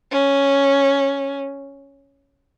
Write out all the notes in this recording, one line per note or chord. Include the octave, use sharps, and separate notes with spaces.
C#4